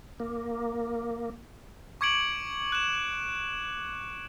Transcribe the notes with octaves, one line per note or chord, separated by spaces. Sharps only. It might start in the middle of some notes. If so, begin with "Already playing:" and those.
A#3
C#6 D6 G#6 C#7 D7 F#7
F#6 E7